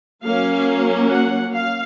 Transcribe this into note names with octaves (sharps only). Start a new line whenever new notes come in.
F#3 A#3 C#4 F5
F#5
F5